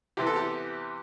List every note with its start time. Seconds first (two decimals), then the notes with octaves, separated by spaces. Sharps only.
0.17 E2 C3 E3 G4
0.27 A4
0.36 G4